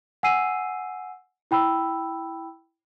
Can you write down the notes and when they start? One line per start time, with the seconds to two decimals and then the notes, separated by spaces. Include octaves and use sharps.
0.23 F#5 G#5 E6 C7 D#7
1.51 E4 G5 B5 E6